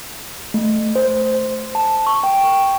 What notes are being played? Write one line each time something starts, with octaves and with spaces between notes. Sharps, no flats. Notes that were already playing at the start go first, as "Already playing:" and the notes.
A3
C5
A5
C#6
G5